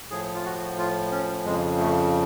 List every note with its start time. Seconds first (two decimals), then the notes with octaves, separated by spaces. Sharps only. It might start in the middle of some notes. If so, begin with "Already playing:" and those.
0.10 A2 F3 G#4
0.35 F4
0.45 F#4
0.78 F4
1.12 C#4
1.45 F2 C#3 F3 G#3
1.80 A3